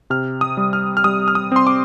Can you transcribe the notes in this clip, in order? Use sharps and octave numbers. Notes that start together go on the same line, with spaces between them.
C3 F6
D#6
G3
F6
F6
G3 D#6
F6
D#6
C4 C6
D6